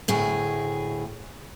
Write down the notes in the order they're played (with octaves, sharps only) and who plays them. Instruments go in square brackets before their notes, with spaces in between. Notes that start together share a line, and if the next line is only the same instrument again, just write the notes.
[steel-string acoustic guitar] D2 A2 G#4